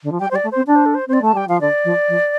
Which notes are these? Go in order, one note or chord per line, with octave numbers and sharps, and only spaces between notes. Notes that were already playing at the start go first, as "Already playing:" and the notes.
D3
F3
G3 G5
G3 C5
D5
A3
C4 C5
D4 D5
C5
A4
C5
C4 C5
D5
A3 A5
G3 G5
F3 F5
D3 D5
F3
F3